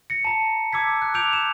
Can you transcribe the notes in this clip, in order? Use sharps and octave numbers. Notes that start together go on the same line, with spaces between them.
A#6 C#7
A5 A#5
A5 D6 E6 G#6 B6
F#6
D6 E6 G6 D7 F7
E7